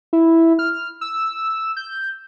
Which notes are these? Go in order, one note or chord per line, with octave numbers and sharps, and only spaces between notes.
E4
F6
E6
G6